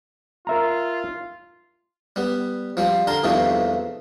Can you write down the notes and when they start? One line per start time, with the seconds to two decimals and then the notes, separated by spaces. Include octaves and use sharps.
0.47 F4 A#4 E5 A#5
2.16 G3 B3
2.77 F3 G3 C4
3.07 D3 A#4 A5 C6
3.24 E2 G2 C3 D#3 F3 A3